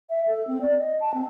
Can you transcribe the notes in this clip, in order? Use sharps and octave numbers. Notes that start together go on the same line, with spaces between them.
E5
A4
C4
D5
D#5
A5
C4